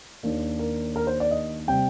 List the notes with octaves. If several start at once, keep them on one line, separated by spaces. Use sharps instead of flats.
D#2 D#3 A#3 D4
A#4
A#4
C5
D5
D#5
C3 G3 G5